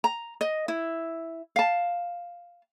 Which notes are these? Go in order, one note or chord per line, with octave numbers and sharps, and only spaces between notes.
A#5
D#5
E4
F5 A5